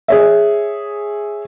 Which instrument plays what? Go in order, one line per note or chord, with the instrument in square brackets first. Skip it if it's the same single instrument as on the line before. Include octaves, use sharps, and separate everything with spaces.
[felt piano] G#4 C#5 E5